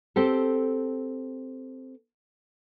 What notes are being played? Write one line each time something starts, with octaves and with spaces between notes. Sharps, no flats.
C4 G4 A4